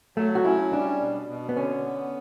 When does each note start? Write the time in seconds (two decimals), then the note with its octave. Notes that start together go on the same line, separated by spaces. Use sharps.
0.17 F#3 A3
0.35 F#4
0.44 C#4 E4
0.73 G3 D4
1.01 B2
1.29 B2
1.49 B3
1.56 D3 C#4
1.85 B3